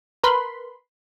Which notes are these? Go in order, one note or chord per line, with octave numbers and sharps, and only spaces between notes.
A#4 B4 B5 C6